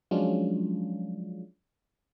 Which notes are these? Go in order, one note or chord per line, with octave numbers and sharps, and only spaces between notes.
F3 F#3 G#3 C#4 D4 F4